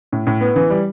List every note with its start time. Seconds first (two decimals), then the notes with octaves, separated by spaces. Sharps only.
0.13 A2
0.27 A2
0.41 B3
0.56 E3
0.70 G3